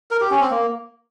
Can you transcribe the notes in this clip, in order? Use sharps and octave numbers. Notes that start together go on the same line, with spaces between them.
A#4
G4
C#4
C4
A#3